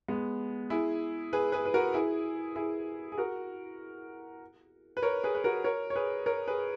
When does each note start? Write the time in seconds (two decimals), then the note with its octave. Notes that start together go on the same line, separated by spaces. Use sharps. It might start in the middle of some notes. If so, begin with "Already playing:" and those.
0.08 G#3 B3
0.70 E4 G#4
1.33 G#4 B4
1.52 G#4 B4
1.65 B4
1.74 F#4 A#4
1.94 E4 G#4
2.56 E4 G#4
3.12 G#4
3.18 F#4 A#4
4.97 B4
5.02 A#4 C#5
5.24 G#4 B4
5.35 B4
5.44 F#4 A#4
5.64 A#4 C#5
5.90 C#5
5.95 G#4 B4
6.26 A#4 C#5
6.48 G#4 B4